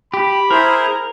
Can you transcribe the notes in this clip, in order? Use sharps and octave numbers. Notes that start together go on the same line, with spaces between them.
G4 B5
E4 G#4 A#4 C5